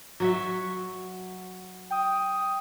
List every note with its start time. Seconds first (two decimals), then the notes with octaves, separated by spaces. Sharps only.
0.20 F#3 F#4 E5
1.91 G5 D#6